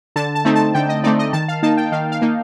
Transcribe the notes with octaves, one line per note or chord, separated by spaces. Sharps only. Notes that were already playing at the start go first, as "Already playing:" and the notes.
D3 A5
A5
A3 C4 D#4
A5
D3 G5
D#5
A3 C4 D#4 D5
D#5
D#3 A5
F5
A#3 D#4 A5
G5
D#3 F5
F5
A#3 D#4